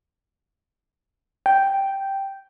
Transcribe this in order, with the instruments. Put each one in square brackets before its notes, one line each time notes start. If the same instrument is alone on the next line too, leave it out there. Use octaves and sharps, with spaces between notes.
[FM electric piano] G5